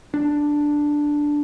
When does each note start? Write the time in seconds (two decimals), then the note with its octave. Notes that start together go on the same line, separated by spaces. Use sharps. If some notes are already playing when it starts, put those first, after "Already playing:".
0.14 D4